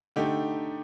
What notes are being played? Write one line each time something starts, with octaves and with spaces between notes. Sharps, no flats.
D3 A3 D#4 G4